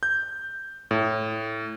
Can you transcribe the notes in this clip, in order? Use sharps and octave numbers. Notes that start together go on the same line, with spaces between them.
G6
A2